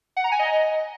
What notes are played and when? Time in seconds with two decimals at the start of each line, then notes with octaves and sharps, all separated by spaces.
0.17 F#5
0.24 A#5
0.32 G#5
0.39 D#5